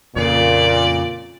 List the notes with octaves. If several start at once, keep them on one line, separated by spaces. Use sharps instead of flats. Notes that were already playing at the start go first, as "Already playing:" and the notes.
F2 A#2 C#3 D5